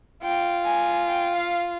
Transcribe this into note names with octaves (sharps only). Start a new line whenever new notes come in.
F4 G5
G#5
G5
F5